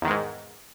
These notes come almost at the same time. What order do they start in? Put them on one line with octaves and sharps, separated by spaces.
E2 D#3 G#3 G#2